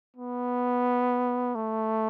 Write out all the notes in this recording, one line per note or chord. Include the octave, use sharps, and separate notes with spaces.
B3
A3